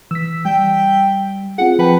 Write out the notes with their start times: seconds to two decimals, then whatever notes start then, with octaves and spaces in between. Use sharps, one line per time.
0.11 E3 E6 B6
0.45 G3 G5
1.58 C4 F4 G#4 F#5
1.79 F3 B4 G5 A5